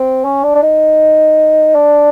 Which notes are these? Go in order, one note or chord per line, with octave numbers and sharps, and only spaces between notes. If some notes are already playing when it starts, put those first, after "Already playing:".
Already playing: C4
C#4
D4
D4
D#4
D4